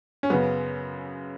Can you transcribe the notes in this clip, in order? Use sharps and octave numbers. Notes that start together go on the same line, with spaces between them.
C#4
F#2 C#3 B3